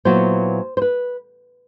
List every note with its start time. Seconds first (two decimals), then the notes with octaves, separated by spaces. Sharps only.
0.05 A#2 F#3 B3 E4 C5
0.77 C5
0.82 B4